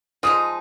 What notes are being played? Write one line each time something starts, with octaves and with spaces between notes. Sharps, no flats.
F3 G#3 D#4 D#6